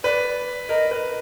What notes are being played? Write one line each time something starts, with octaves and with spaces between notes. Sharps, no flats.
B4 D5
A#4 D#5
B4